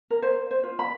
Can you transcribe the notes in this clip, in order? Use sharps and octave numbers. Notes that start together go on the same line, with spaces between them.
A#4
C5
C5
F4
B5